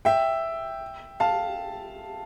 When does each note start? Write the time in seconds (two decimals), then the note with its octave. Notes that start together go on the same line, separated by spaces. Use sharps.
0.05 E5 G5
1.20 F5 A5